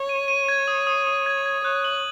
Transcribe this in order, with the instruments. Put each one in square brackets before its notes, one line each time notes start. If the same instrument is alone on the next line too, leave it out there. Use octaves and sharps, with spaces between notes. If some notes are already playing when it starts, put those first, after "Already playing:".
Already playing: [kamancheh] C#5
[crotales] D#7
D#7
G#6
D#6
D#6
D#6
G#6
G#6
[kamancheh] C#5 [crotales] F#6
[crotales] F#7